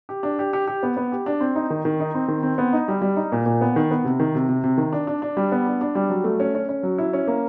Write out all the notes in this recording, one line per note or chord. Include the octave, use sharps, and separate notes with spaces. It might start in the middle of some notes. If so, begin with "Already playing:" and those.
G4
D4
G4
G4
G4
B3
B3
G4
D4
C4
D#4
D#3
D#3
D#4
C4
D#3
C4
B3
D#4
G3
G3
D#4
A#2
A#2
B3
D#3
B3
C3
D#3
C3
C3
C3
D#3
D4
D4
D4
G3
B3
D4
D4
G3
F#3
A3
C#4
C#4
C#4
F#3
E4
C#4
A#3